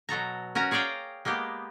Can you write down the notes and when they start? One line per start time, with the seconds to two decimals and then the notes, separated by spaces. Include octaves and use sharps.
0.09 B2 F#3 A4 A#5
0.55 C#4 F#4 A#4 A#5
0.71 G#4 C#5 D5 F5 G5 A#5
1.25 G#3 A#3 B3 G4